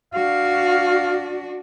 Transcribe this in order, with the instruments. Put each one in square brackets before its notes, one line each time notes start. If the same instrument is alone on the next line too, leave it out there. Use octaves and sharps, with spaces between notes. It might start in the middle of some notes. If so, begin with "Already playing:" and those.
[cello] D4 F#4 [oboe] F5